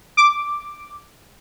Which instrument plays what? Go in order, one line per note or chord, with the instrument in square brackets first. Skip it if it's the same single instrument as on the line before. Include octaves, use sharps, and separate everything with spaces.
[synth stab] D6